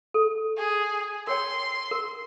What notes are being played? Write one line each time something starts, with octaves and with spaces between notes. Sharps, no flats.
A4
G#4
A#4 C#5 G5 C6
A#4